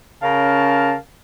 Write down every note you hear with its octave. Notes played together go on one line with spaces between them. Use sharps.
C#3 C#4 A#4 F5 A5